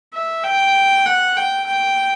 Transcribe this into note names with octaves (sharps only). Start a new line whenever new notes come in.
E5
G5
F#5
G5
G5